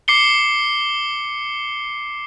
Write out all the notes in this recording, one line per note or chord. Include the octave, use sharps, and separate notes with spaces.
D6 C7 C#7 G7